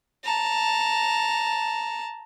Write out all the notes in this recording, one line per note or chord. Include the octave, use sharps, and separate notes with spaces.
A5 A#5